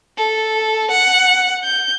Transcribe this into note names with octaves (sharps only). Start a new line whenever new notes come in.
A4
F#5
G6